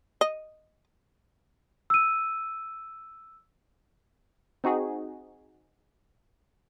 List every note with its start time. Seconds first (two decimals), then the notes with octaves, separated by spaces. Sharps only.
0.21 D#5
1.90 E6 D#7
4.64 C4 D#4 F#4 G#4